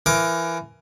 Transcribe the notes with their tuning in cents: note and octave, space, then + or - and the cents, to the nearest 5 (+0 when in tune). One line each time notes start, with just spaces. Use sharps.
E3 +20 A#4 +15 D6 +0